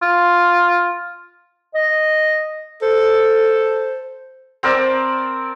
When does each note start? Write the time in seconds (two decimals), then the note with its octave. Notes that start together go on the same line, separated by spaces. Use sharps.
0.02 F4
1.75 D#5
2.82 A4 C5
4.63 C4 A#4 D5 A5